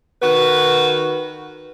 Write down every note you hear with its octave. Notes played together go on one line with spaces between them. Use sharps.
D#3 F#4 B4